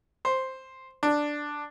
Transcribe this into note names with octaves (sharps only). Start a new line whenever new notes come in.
C5
D4